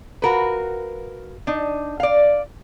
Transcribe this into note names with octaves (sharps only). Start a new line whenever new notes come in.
F4 F#4 A#4 B4
D4 D#4
D5 F5